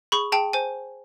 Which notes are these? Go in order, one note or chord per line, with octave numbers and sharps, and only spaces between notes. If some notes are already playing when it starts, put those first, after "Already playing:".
G#4 B5 C#6
G#4 G5 A5
C5 G#5